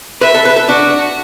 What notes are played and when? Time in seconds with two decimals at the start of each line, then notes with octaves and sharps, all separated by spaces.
0.21 B4 E5
0.35 A4
0.45 B4
0.56 A4
0.68 D4 F#4